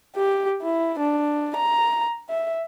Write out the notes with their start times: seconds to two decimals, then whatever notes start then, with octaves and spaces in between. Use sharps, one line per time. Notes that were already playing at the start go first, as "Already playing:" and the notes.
0.16 G4
0.62 E4
0.99 D4
1.56 A#5
2.29 E5